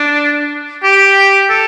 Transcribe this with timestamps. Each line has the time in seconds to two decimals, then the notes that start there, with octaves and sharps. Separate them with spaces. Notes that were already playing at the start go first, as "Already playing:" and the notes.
Already playing: D4
0.83 G4
1.50 A4